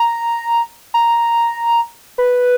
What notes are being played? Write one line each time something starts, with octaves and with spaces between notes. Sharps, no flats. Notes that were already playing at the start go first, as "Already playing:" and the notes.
Already playing: A#5
A#5
B4